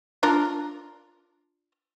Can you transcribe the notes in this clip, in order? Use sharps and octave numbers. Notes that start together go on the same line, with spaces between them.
D4 F4 A#4